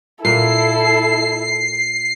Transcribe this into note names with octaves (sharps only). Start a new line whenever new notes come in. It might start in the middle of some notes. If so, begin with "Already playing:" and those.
A#2 A#3 E4 A4 C7